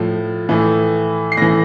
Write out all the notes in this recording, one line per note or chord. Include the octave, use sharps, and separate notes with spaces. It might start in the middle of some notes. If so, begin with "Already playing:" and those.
Already playing: A2 F3
A2 E3
C7
A2 E3 A#6